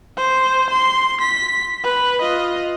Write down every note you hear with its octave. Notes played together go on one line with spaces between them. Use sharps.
C5
C6
B6
B4
F4 D#5